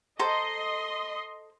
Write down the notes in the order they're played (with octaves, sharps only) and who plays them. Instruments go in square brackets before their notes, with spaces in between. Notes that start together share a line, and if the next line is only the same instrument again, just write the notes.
[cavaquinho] A4 C5 A#5 [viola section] D#5 C6